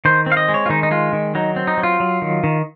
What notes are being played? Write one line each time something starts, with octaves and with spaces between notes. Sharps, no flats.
D#3 C5
C4
F5
D#5
G#3
C#5
F4
D#3 D#4
D#4
G#3 F4
D#3
F#3 D#4
C4
D#4
F#3
F4
F#3
D#3
D#3